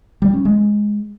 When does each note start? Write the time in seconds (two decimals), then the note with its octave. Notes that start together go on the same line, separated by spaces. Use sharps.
0.22 G3
0.33 C#4
0.45 G#3